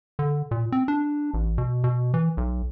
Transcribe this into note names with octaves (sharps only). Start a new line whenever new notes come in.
D3
A#2
C4
D4
A1
B2
B2
E3
B1